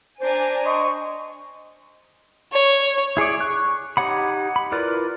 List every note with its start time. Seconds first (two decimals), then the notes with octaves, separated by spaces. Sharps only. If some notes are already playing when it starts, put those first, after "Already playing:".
0.21 D4 C5 G#5 A#5
0.65 D#5 C6 C#6
2.51 C#5
3.17 E4 G#4 C#5 D5
3.40 C#6 F#6
3.97 D#4 G4 C#5 F#5 B5
4.56 B5
4.72 E4 F4 A#4 B4 D5